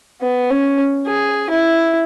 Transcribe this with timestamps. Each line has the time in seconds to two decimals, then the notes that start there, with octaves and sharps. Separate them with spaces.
0.22 B3
0.50 C#4
1.07 G#4
1.50 E4